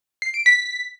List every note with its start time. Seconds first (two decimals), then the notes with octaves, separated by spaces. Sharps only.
0.22 C7
0.34 D7
0.46 B6